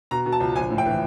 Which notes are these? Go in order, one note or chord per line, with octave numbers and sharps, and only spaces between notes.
B2 A#5
B2
A5
C#2
A#1 G#5
A2
G5
E3